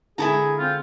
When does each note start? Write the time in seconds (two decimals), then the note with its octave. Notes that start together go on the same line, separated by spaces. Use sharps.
0.18 D3 G#3 E4 G#4 A4 A#5
0.59 C4 F4